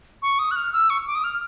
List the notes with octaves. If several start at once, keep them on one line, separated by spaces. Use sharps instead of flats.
C#6
D#6
F#6
F6
E6
C#6
D6
D#6
F6